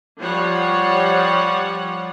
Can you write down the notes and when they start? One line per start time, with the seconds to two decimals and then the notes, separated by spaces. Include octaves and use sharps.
0.21 F3 G3 C#5 F#5